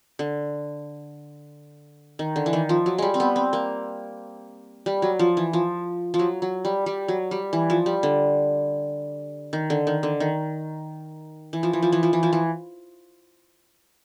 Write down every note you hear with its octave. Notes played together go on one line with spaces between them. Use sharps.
D3
D#3
D3
E3
D#3
F3
F#3
G3 G#3
C4
B3
C4
A#3
G3
F#3
F3
E3
F3
F3
F#3
F#3
G3
G3
F#3
G3
E3
F3
G3
D3
D#3
D3
D#3
D3
D#3
E3
F3
E3
F3
E3
F3
E3
F3
E3